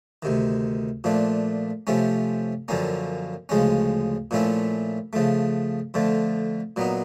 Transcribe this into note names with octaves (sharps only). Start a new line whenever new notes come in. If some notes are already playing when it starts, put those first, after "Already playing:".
D2 C3 D#3
A#2 F3 A3 D4
C3 F3 A3 C#4
F#2 D3 F3 A#3 C#4
D2 C#3 F3 G#3 C#4
A#2 F3 A3 C#4 E4
C#3 F3 A3
F2 D3 F3 A3
A#2 F#3 B3 D#4